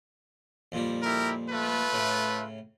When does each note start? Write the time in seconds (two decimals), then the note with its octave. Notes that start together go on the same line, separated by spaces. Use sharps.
0.72 F2 A#2 G3
1.03 E4 G4 A#4
1.50 A3 F4 B4
1.93 A2 C#3